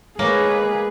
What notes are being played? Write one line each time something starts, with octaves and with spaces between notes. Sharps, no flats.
G#3 A#3 G#4 B4 C#5